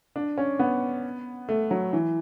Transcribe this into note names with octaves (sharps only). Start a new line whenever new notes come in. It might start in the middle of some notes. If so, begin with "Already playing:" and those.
D4
C#4
B3
A3
F#3
E3